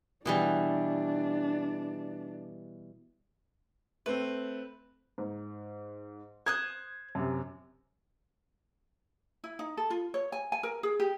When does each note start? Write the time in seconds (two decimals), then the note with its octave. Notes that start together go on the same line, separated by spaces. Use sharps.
0.25 B2 E3 G3 D4
4.06 A3 C4 B4
5.18 G#2
6.46 C5 D#6 F#6 G#6
7.15 F#2 C3
9.44 E4
9.59 D#4
9.77 A4
9.90 F4
10.14 C#5
10.32 G#5
10.52 G#5
10.63 A#4
10.83 G#4
11.00 G4